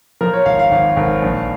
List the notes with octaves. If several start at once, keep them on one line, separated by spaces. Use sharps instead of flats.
F3 A#4
C#5
G#1 F5
F5
G#1
G#1
A#1